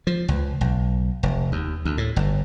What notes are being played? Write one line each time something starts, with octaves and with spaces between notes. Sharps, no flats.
F3
C#2
B1
F1
D#2
D2
A2
G1